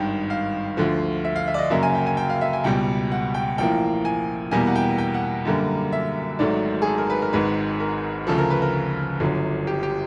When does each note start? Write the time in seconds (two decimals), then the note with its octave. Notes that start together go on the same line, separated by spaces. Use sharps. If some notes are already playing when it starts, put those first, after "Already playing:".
Already playing: G#1 G2 D#3 G5
0.30 F5
0.77 D2 D3 F3
1.25 E5
1.36 F5
1.48 E5
1.54 D5
1.58 D#5
1.70 F#2 C#3 F#3 A#3 E5
1.83 G#5
1.95 G5
2.07 G#5
2.17 G5
2.30 F5
2.41 E5
2.53 G#5
2.64 C#2 B2 G3 G5
3.12 F#5
3.34 G5
3.58 A1 A2 F3 A#3 G5
4.05 G#5
4.51 E2 B2 G3 A#3 G#5
4.67 F#5
4.76 G5
4.98 G5
5.14 F#5
5.45 F#2 D3 G3 A#3
5.92 E5
6.39 G#1 G#2 D#3 F#3 A3 D5
6.82 G#4
6.87 A4
6.98 A#4
7.10 B4
7.22 A#4
7.33 G#1 G#2 D#3 G#3 B4
7.80 A#4
8.27 D2 C#3 F3 A4
8.38 A#4
8.50 B4
8.62 A#4
9.20 G1 F#2 D3 F#3
9.67 G4
9.83 G4